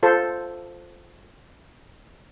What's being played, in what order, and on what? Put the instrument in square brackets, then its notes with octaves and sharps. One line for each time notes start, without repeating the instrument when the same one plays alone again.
[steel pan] F4 A4 C5